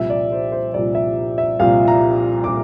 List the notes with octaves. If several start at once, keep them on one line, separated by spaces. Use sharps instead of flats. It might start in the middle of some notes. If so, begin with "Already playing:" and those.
Already playing: C2 A#2 F3 E5
D5
C5
C5
C2 A#2 F3 D5
E5
E5
C2 A#2 F3 F5
A#5
A#2 F3 D6